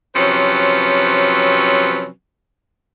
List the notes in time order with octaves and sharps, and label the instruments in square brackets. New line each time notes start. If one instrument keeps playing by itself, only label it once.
[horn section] C3 F3 F#3 C4 C#4 B4